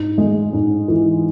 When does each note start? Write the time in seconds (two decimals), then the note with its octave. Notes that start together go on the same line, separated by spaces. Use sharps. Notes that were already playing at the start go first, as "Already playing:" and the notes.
Already playing: G#2
0.18 G#3
0.53 G#2
0.88 E3